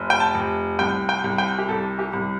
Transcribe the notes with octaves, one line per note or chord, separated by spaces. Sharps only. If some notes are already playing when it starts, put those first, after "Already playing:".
Already playing: F1
G5
A5
F1
C2 G5
G5
C2
G5
G4
C2 A4
G4
C2